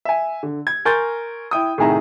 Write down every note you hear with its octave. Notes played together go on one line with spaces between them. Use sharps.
E5 G#5
D3
G#6
A#4 G#5 C6 C#6 G6 A6
E4 G5 D#6
A2 C3 D#3 G#4 E5 A#5